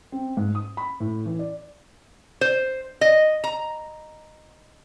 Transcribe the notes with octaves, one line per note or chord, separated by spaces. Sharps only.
C4
G#2
D#6
B5
A2
E3
D5
C5
D#5
A#5